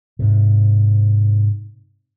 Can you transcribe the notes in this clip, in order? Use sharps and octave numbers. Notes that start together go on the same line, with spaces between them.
G#2 C3